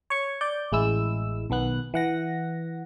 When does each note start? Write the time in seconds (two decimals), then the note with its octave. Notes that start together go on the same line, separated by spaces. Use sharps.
0.10 C#5 C#6
0.41 D5 G6
0.72 A1 G#3 E4 E6
1.50 B1 D#3 B3 F#6
1.94 E3 F#5 A#6